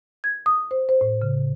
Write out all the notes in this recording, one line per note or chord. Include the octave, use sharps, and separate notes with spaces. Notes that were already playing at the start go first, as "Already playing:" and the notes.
G#6
D#6
C5
C5
A2
C#3